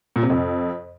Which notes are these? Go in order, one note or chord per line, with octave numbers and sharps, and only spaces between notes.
A#2
C3
F2